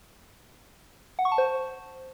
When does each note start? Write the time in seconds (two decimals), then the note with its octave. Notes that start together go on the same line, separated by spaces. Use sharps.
1.19 F#5
1.25 C#6
1.32 A5
1.38 C5